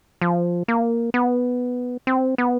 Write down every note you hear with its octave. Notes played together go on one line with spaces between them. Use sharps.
F3
A#3
B3
C4
B3